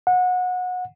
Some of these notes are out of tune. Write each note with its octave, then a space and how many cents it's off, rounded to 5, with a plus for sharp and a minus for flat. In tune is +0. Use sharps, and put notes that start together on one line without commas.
F#5 -25